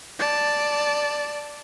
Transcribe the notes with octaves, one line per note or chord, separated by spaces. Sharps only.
D5 A5